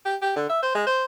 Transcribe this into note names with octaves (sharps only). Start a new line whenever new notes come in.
G4
G4
D3
E5
C5
G#3
C5